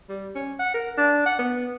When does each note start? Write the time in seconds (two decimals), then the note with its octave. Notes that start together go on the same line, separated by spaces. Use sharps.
0.09 G3
0.35 C#4
0.59 F#5
0.74 A#4
0.97 D4
1.26 F#5
1.39 B3